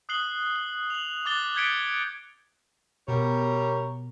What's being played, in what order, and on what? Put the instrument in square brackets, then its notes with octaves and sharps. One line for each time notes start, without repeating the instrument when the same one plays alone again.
[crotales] D#6 F#6 C7 F#7 G7
G7
F7 F#7
D6 F#6 A6 G7
G6 G#6 B6 C#7 D7
[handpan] B2 [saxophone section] G3 A#4 C#5